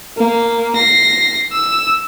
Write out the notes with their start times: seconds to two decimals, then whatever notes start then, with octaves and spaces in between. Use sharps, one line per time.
0.17 A#3
0.76 A#6 C7
1.52 E6